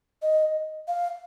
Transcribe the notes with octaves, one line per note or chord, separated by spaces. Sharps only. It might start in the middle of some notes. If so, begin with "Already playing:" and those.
D#5
F5